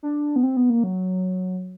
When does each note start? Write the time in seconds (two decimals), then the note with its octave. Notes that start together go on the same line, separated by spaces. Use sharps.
0.03 D4
0.36 B3
0.43 C4
0.57 B3
0.70 A#3
0.84 F#3